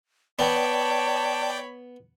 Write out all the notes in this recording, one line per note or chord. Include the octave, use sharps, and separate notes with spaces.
B3 C#5 D5 G5 A5 B5